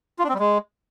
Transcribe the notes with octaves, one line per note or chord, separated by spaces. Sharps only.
F4
D4
C4
G3
G#3